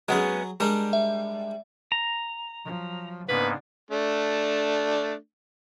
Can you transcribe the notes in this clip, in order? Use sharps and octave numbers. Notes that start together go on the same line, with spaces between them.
F#3 G#3 B3 C#4 G#4
G3 G#3 D4 A#4
E5
A#5
F3 F#3
G#2 C#3 A#3 B3 D4 B4
A3 D4